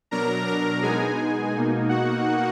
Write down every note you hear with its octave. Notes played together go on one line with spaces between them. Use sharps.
B2 F#3 D4 A#4 A#5
A#4 A#5
B2 G#3 B3 D#4 G#4 G#5
B2 A#3 D#4
F#4 F#5